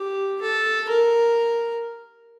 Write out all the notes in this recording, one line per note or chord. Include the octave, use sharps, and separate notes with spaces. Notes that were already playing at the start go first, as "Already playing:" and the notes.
Already playing: G4
A4
A#4